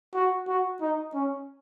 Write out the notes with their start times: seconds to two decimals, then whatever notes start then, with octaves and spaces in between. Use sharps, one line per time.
0.14 F#4
0.48 F#4
0.81 D#4
1.14 C#4